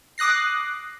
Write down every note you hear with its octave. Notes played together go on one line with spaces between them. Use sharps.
D6 D#6 F#6 A#6 C7